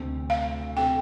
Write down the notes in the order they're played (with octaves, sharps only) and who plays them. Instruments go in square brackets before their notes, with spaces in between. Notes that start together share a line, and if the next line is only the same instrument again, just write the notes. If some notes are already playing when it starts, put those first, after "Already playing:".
Already playing: [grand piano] D2 C3 A3 C4 A4
[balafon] F5
[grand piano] C3 A3 C4 A4 [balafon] G5